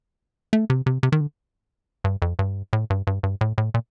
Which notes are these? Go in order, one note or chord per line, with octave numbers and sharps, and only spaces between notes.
A3
C3
C3
C3
D#3
D3
G2
F2
G2
A2
G2
G2
G2
A2
A2
A#2